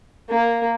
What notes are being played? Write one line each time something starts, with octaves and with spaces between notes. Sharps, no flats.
A#3